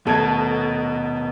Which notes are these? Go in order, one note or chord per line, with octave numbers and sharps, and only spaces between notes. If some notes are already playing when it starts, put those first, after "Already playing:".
D#1 B2 A3 A4 G#6